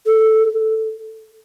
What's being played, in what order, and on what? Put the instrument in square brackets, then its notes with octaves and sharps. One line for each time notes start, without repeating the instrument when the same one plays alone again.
[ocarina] A4